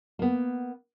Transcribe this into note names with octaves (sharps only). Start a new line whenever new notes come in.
A#3 B3